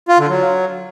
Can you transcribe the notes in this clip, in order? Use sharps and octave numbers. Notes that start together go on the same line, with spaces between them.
F4
D3
F#3